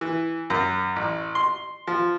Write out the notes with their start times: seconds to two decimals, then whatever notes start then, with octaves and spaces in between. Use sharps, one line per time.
0.01 E3
0.50 F#2
0.96 A1
1.35 C6
1.87 F3